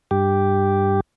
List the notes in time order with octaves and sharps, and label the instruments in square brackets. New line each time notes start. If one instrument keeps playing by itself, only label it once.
[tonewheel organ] G2 G4